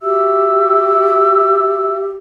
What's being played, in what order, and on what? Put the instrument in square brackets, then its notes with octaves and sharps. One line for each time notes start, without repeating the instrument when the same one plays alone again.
[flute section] F#4 E5 E6 [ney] G4